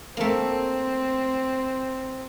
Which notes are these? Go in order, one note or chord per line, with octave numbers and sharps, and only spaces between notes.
A3 A#3 C4